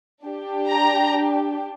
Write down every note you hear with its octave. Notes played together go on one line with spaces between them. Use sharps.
D4 G4
A#5